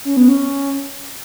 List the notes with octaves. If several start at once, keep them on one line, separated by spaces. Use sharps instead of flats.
C#4
B3
C#4